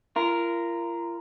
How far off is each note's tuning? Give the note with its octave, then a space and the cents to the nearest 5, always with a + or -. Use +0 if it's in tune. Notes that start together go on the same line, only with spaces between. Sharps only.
F4 -40 A#4 +0